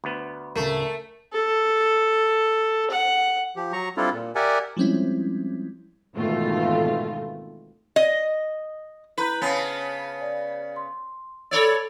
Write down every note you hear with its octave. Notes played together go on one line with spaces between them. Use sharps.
D2 B3
D1 C#3 A3 A#4
A4
F#5
F3 G4
F#3 A#5 C#6
G3 C4 D4 E4 F4 A4
A#2
G4 A#4 D5 E5 F#5 G#5
F3 G3 G#3 C4 C#4 E4
G#1 E2 B2 D#3 A3 F4
D#5
E4 B4 A#5 G6
C#3 B3 C#5 G#5 A5
D5
C6
A4 C#5 D5 B5 E6